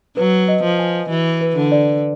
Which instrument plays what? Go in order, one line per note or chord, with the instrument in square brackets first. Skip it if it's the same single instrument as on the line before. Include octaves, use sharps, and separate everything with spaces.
[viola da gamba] F#3 [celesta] B4
[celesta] D#5
[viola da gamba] F3
[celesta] G#5
[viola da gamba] E3 [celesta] F#4
[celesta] B4
[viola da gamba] D3
[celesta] D5